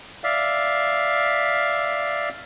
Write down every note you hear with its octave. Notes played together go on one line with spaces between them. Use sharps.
D5 E5 F5